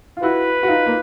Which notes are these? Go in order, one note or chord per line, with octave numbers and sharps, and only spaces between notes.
F4
E4 F#4 B4
F#4
D#4 F4
A#3